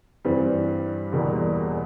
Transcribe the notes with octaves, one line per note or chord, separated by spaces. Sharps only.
G2 E3 G3 C4
E1 E2 B2 G3 A#3